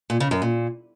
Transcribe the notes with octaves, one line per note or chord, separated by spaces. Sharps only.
A#2
C#3
F#2
A#2